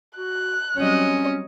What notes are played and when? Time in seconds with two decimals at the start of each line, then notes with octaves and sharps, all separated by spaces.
0.18 F#4 F#6
0.77 F#3 G3 C4 C#4 C#5 D#5